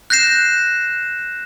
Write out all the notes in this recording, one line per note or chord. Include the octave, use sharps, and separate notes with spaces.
F#6 G6 A#6 C7 E7